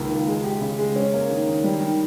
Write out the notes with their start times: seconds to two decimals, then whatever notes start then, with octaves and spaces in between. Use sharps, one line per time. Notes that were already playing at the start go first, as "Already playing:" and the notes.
Already playing: C#2 D#3 A#3
0.10 D#3
0.27 G#3
0.44 G4
0.61 C#3
0.78 G#3
0.96 C#4
1.13 A#3
1.30 D#3
1.48 D#3
1.64 G3
1.81 D#3